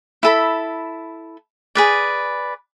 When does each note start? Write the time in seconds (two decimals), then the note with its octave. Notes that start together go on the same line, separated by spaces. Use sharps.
0.23 E4 A4 B5
1.75 G#4 B4 D5